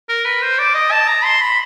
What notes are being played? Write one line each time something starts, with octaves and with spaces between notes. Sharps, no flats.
A#4
B4
C5
D5
D#5
A5
A#5
C6
B5